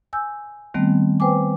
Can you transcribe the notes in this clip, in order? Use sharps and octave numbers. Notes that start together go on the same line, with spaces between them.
G#5 E6 G6
D#3 G3 A3 B3 C4
B4 C5 G5 G#5 D6